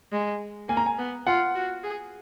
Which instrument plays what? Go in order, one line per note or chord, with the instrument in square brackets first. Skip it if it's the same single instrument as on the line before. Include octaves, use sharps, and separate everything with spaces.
[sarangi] G#3
[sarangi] A#3 [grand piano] G#5
[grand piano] A#5
G#5
[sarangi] B3
[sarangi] F4 [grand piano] F#5
[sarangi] F#4
G#4